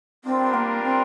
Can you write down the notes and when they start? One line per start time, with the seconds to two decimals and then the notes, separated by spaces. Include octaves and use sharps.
0.25 G3 C4 D4 F4 A#4
0.54 A#3
0.83 C4